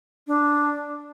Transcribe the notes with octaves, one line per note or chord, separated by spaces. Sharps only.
D4